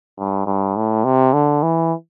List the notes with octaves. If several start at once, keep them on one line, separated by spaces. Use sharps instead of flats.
G2
G2
A2
C3
D3
E3